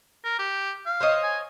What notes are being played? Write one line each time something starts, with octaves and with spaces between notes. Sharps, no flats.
A#4
G4
F5
C5 C#5 D#5
G#5